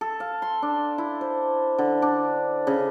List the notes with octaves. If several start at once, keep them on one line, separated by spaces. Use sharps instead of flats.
A4
F5
C6
D4
E4
C5
D3
D4
C#3